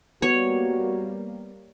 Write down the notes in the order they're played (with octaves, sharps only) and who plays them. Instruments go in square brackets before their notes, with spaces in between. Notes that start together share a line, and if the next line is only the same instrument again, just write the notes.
[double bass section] G3 A#3 [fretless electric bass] B3 [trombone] F#4 [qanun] C#5